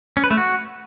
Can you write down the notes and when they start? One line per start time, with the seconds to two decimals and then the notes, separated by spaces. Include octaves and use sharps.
0.17 C#4
0.24 B4
0.31 A3
0.37 F#4